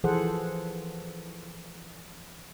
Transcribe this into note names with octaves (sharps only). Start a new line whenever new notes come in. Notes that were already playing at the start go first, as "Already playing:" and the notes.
E3 F3 G#4 A4 C5 F#5